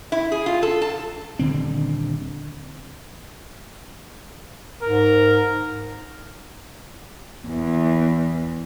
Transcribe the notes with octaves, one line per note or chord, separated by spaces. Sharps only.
E4
G#4
F4
A4
A5
D#1 D3 C4
G#2 A#4
E2